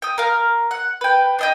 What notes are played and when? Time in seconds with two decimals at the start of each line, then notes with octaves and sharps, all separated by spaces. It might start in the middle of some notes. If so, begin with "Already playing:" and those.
0.02 G5 D#6
0.18 A#4 F5
0.71 F#5
1.01 B4 G5
1.39 D4 D#5 G5